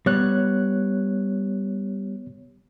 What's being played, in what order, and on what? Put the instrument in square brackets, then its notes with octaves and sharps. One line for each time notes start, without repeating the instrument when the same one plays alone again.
[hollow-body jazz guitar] G3 [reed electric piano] B3 C#5 F#6